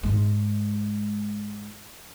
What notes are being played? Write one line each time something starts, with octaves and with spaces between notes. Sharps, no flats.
G#2 G#3